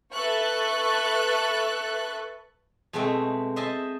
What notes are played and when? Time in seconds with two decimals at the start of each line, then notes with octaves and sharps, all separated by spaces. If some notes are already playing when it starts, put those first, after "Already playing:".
0.13 A4 B4 E5 A5 C#6 F#6
2.93 B2 G#3 A3 C4 E5 G5
3.56 C5 D#5 E5 G#5 A5